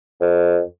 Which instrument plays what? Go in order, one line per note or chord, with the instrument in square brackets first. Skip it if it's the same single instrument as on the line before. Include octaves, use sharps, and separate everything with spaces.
[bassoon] F2